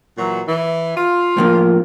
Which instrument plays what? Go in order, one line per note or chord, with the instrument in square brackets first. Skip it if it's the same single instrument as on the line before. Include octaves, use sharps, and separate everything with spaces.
[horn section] A#2 E3 F#3
E3
F4
[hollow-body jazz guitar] A2 F3 A#3